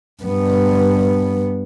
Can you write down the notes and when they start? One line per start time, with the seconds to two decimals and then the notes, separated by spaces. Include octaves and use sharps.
0.23 G2 B3